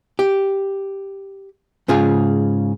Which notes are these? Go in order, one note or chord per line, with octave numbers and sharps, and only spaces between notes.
G4
G#2 C#3 F4 G#4